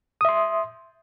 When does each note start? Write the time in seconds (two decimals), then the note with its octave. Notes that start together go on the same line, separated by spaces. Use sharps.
0.21 D#6
0.25 E5
0.29 C6